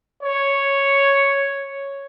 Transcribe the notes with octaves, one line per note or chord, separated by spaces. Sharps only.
C#5